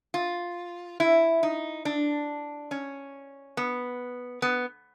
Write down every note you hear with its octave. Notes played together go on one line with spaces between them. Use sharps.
F4
E4
D#4
D4
C#4
B3
B3